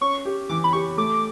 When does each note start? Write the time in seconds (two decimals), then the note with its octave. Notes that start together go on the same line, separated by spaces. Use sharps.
0.01 C#4 C#6
0.25 G4
0.49 E3 D6
0.64 B5
0.73 G4 C#6
0.97 A3 D6